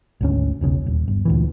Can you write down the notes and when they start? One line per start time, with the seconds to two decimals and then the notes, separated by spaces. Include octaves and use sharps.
0.21 G#1 D2 C#4
0.61 E1 B1 C#3
0.86 D#1
1.08 G1
1.25 D2 A#2 E3